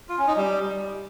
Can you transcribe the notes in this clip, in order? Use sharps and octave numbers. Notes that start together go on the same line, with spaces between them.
F4
C#4
D#4
G3